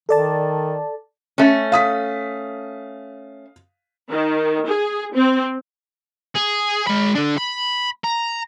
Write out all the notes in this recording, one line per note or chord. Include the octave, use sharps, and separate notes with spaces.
D#3 A4 D5 A5
A3 C#4
F5 D#6 B6
D#3
G#4
C4
G#4
G#3 B5
D3 D4
B5
A#5